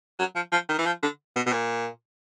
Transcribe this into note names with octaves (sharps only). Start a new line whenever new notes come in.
F#3
F3
F3
D#3
E3
F3
D3
B2
B2
A#2